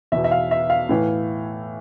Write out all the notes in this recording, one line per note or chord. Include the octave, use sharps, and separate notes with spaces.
E2 B2 E5
E5
F5
E5
F5
A2 E3